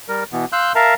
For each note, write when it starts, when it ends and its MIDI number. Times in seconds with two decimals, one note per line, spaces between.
0.09 0.24 55
0.09 0.24 70
0.32 0.45 47
0.32 0.45 52
0.32 0.45 59
0.53 0.73 77
0.53 0.73 84
0.53 0.73 88
0.53 0.73 90
0.53 0.73 91
0.75 0.94 70
0.75 0.94 76
0.75 0.94 77
0.75 0.94 81
0.75 0.94 82